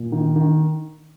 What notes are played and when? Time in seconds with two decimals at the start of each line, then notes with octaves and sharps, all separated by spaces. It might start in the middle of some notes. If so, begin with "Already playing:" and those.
Already playing: A#2
0.12 D#3
0.36 D#3